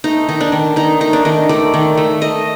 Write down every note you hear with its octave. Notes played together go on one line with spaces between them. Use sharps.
A3 D#4
D#3 D#4
D4
D#3
D#3 D#4
A3 D#4
D4
D#3 D#4
A3 D5
D#3
A3
A3 D#5